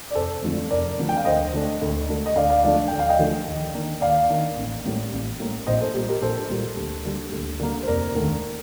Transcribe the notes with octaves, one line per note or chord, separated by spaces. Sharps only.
D5
F1 A4 C5
F2 D3 F3 A3
F1 A#4 D5
F2 D3 F3 A3
G5
F5
D2 C5 D#5
D3 A3 D4
D2
D3 A3 D4
D#5
D2 D5 F5
D5 F5
D3 F3 A3 D4 D5 F5
D2 G5
F5
D#5 G5
D3 F3 A3 D4
D#2
D#3 A#3 D4
D#2 D5 F5
D#3 A#3 D4
A1
A2 G3 A#3
A1
A2 G3 A#3
A#1 C5 D#5
A4 C5
A#2 G3 A#3 G4
G4 A#4
A#1 A4 C5
A#2 G3 A#3
D2
D3 G3 A#3
D2
D3 G3 A#3
C5
F1 A#4 D5
D#2 D3 A3 D4